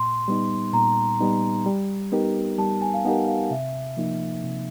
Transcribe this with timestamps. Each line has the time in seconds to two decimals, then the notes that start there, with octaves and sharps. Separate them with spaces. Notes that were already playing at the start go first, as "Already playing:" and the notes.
Already playing: A#2 C6
0.28 G3 B3 D#4
0.73 A#2 A#5
1.20 G3 B3 D#4
1.66 G3
2.12 B3 D#4 G4 A#4
2.58 G3 A5
2.82 G#5
2.94 F5
3.05 B3 D#4 G4 A#4 F#5
3.28 F5
3.50 C3 E5
3.97 F3 A#3 D#4
4.44 C3